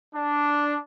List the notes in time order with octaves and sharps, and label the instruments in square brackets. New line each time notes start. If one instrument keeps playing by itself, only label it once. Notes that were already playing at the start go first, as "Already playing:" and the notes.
[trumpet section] D4